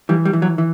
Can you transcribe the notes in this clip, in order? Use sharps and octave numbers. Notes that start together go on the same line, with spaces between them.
E3 G3
G3
E3
F#3
E3